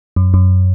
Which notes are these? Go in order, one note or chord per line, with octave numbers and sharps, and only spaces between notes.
F#2
F#2